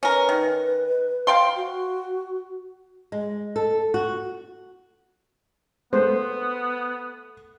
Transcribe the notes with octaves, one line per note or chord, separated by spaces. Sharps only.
C#4 A#4 B4
D#3
F5 G5 C6
F#4
G#3
A4
F#4
A3 B3 C5